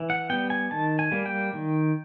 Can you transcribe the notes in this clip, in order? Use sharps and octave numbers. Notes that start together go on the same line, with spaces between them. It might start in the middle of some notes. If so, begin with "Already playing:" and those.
Already playing: E3
F#5
G3 B3 G5
G#5
D#3 A5
G#5
G3 A#3
G5
D#3